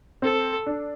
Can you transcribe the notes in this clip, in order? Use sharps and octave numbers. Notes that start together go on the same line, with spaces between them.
C4 A4
D4